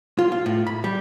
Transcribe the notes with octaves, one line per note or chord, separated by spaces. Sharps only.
F4
F4
A2
B5
G3